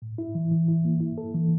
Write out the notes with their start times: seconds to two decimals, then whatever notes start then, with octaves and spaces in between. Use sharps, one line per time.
0.02 A2
0.18 E4
0.35 E3
0.51 E3
0.68 E4
0.85 A#3
1.00 E4
1.18 A4
1.34 E3